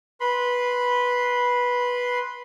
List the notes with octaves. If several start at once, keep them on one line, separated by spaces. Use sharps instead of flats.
B4 B5 C6